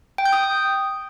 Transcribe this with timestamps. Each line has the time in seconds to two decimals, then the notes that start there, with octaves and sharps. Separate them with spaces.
0.18 G5
0.25 G6
0.33 D#6